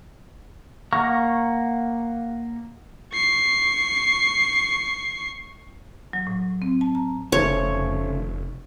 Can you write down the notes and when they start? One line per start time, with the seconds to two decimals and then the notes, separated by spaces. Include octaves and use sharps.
0.93 A#3 F#5 A#5 C#6 F6
3.13 C#6 C7
6.13 F#3
6.27 A2
6.62 C4
6.81 A5
6.95 A#5
7.32 F1 C#3 A3 C5 C#5